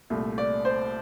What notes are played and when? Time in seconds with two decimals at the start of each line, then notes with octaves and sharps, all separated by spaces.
0.10 C2 A#2 A3
0.38 D5
0.65 C5